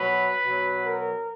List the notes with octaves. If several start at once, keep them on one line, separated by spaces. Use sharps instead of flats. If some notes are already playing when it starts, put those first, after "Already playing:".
Already playing: B2 F#3 B4
B2 F#3
A#4